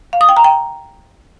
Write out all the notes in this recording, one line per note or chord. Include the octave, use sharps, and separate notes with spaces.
F5
D#6
G5
A#5
G5